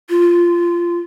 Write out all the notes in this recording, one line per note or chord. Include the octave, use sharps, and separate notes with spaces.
F4